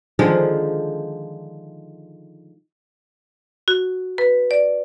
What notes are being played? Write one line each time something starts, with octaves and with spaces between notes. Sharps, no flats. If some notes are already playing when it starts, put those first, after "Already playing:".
D3 D#3 F3 G#3
F#4
B4
D5